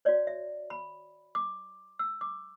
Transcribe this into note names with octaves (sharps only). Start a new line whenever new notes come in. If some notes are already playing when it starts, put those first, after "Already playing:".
F#4 C#5 D5
E5
B5
D6
E6
D6